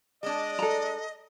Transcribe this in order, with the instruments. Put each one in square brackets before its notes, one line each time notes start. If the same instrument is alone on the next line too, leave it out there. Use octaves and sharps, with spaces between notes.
[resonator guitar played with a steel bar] G#3 D4 [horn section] D5 [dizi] D#5
[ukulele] A4 A#5